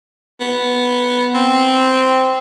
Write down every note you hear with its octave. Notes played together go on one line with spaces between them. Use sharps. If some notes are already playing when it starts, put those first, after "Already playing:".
B3
C4